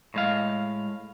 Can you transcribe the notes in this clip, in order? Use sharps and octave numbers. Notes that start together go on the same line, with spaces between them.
A2 G#3 F5